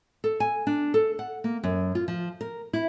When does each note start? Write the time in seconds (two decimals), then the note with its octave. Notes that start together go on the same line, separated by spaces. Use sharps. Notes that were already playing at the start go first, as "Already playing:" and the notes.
0.24 A4
0.40 G#5
0.67 D4
0.94 A4
1.19 F#5
1.44 A#3
1.64 F#2
1.95 F4
2.08 F3
2.41 A#4
2.73 E4